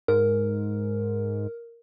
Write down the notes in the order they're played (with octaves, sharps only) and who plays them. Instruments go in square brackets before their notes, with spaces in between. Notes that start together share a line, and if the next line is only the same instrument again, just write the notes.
[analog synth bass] G#2 [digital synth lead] A#4